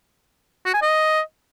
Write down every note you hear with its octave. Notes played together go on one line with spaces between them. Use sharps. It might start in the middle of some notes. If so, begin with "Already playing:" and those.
F#4
G#5
D#5